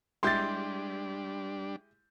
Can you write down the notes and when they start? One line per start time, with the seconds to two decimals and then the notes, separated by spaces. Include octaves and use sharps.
0.23 G3 G#3 D4 E4 G4 C6 G6 A6